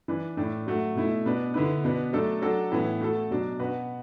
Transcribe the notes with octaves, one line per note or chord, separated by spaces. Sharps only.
E3 D4 B4
A2 A3 D4
F#3 A3 F#4
B2 A3 E4
B2 B3 D4 B4
D3 B3 E4 B4
B2 B3 D4 B4
F#3 A3 D4 A4
F#3 D4 F#4 A4
A2 E3 B3
A3 F#4 A4
B2 F#3 D4
B2 B3 F#4 B4